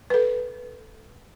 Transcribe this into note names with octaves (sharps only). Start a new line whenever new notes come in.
A4 B4